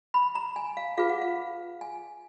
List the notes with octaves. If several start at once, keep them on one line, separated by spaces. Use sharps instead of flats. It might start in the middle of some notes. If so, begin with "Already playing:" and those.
B5
A#5
G#5
F5
F4 G#4 B4 F5
F#5
F5
G#5